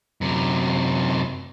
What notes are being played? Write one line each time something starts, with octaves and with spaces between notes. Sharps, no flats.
F#2 C3